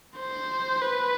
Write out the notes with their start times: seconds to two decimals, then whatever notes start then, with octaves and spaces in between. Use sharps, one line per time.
0.18 C5
0.82 B4